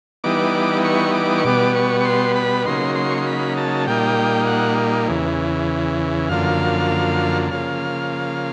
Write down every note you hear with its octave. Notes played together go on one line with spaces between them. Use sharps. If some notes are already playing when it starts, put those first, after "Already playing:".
E3 G3 B3 D#4 D6
C#6
D6
C#6
B2 G3 B3 D6
C#6
C#6
C6
B5
C#3 F#3 A#3 D#4 C6
C6
C#6
C6
B5
A5
A#2 G3 A#3 D#4 G5
F#5
E2 C#3 E3
F#2 D3 F3 A#3 F5
C#3 F3 A#3 F5